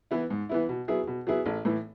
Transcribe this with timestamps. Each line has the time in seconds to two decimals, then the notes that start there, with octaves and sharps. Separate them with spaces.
0.11 E3 B3 E4
0.30 G#2
0.49 E3 B3 E4
0.69 B2
0.88 F#3 B3 E4 G#4
1.07 B2
1.27 F#3 B3 E4 G#4
1.46 A1
1.65 A2 E3